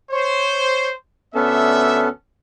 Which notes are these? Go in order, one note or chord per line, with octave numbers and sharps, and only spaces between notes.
C5 C#5
D2 B3 C#4 A4 D5 E5